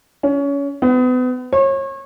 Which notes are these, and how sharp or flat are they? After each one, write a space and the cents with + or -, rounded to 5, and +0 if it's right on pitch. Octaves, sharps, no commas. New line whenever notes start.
C#4 +25
B3 +35
C#5 -35